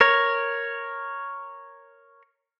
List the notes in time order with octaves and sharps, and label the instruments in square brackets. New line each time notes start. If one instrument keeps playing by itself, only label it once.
[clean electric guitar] A#4 C#5